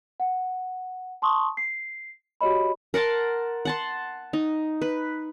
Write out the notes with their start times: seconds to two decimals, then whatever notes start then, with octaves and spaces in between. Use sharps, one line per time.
0.20 F#5
1.22 A5 C6 C#6 D#6
1.57 C7
2.41 F#4 G4 C#5 D#5 B5
2.94 A#4 F#5 A5 C6
3.65 F#5 A5 C6
4.33 D#4
4.82 B4